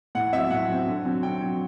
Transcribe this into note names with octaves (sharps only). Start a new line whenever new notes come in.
A2 F#5
F#3 C4 E5
A2 F#5
F#3 C4
D3
F#3 C4
D3 G5
F#3 C4